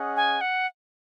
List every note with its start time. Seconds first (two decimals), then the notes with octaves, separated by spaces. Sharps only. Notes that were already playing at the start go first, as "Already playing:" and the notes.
Already playing: C#4 G#4 D#5 F#5
0.16 G#5
0.41 F#5